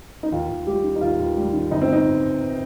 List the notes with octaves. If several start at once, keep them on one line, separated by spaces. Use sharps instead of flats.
D#4
D#2 F4
D#2
G3 G4
D#3
D#4
D#2 F4
D#2
G3
D#3
G1 D#4
C4
D#4